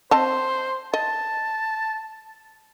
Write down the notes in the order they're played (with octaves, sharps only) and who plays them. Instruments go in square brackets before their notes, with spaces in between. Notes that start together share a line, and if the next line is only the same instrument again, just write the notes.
[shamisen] C4 D#5 A5 [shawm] C5
[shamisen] D#5 [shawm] A5